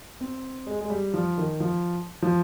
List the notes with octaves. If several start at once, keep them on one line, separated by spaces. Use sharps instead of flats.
C4
G#3
G#3
G3
F3
D#3
F3
F3